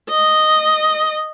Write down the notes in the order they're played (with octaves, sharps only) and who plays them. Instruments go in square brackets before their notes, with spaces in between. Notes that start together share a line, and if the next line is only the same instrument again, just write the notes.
[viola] D#5